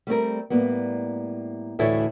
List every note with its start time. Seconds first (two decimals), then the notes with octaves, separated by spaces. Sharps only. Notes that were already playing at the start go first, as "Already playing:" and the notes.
0.07 G3 A3 C4 A#4
0.50 A2 G3 A#3 B3
1.79 D2 A2 E3 E4 A4 C#5